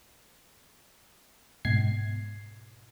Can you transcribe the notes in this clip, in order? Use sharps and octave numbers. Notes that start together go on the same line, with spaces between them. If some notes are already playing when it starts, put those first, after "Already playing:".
G#2 B2 G#6 C7